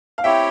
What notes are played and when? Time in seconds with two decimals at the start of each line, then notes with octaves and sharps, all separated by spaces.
0.18 F5
0.23 C4 E4 G4 C#5 E5 G5